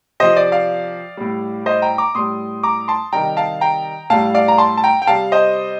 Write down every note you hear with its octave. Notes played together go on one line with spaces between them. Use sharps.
C3 F3 C5 D#5
D5
D5 F5
A2 G3
C5 D#5
G5 A#5
A#5 D6
A2 G3 C6 D#6
A#5 D6
A5 C6
C3 D#3 G3 G5 A#5
F5 A5
G5 A#5
A2 G3 F5 A5
D5 F5
A#5
A5 C6
A5
G5 A#5
G5
C3 G3 F5 A5
C5 D#5